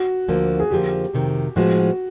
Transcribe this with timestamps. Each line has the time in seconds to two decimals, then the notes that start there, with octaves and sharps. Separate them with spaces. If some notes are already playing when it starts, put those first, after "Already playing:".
Already playing: F#4
0.28 D2 D3 F3 A#3
0.60 G#4
0.71 F2 D3 F3 A#3 G4
1.13 F2 C3 D#3
1.56 A2 F3 G#3 B3 F#4